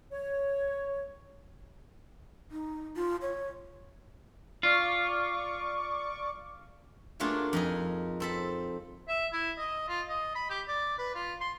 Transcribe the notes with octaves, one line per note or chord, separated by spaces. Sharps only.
C#5
D#4
F4
C#5
F4 D5 C#6 D6
F#3 A3 A#3 D4 F4 G#4
F2 D#4 G#4
C4 A4 B5
E5
E4
D#5
F4
D#5
B5
G4
D5
B4
F4
C6